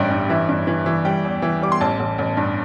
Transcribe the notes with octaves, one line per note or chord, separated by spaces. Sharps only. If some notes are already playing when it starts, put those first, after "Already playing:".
Already playing: A1 G2 G3 E5 G5
G2
E3 E5
G2
E3
E3
G3 G5
E2
E3
G3 D6
C6
A1 A5
A1
A1
G2